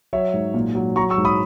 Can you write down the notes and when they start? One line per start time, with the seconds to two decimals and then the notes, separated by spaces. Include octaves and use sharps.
0.13 F#3 C#5 E5
0.34 G#2
0.54 A#2
0.75 F#3
0.96 F#3 A#5 C#6
1.10 C#6 E6
1.18 G#2
1.25 B5 D#6